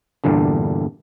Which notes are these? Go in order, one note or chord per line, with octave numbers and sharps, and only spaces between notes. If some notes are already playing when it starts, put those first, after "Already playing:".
E2 G2 A#2 D3